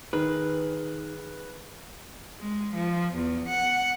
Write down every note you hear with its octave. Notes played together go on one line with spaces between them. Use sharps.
D#3 G#4 B4
G#3
F3
E2
F#5